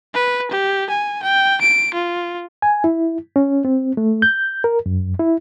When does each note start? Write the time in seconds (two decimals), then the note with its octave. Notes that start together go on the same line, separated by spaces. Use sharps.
0.14 B4
0.51 G4
0.89 G#5
1.22 G5
1.61 D7
1.94 F4
2.62 G#5
2.84 E4
3.36 C#4
3.65 C4
3.97 A3
4.22 G6
4.64 A#4
4.86 F#2
5.20 E4